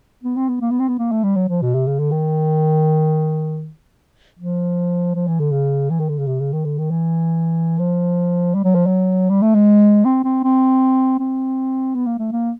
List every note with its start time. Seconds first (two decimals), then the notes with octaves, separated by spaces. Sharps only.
0.23 B3
0.36 C4
0.48 B3
0.61 A#3
0.71 B3
0.79 C4
0.88 B3
0.98 A#3
1.11 A3
1.24 G3
1.35 F#3
1.48 F3
1.61 B2
1.74 C3
1.87 C#3
1.99 D3
2.11 D#3
4.39 F3
5.15 F3
5.27 E3
5.40 D3
5.52 C#3
5.90 E3
5.99 D#3
6.09 D3
6.19 C#3
6.27 C3
6.40 C#3
6.52 D#3
6.64 D3
6.78 D#3
6.91 E3
7.78 F3
8.54 G3
8.64 F#3
8.75 F3
8.86 F#3
9.29 G3
9.42 A3
9.54 G#3
10.05 C4
10.24 C4
10.43 C4
11.19 C4
11.94 B3
12.06 A#3
12.19 A3
12.32 A#3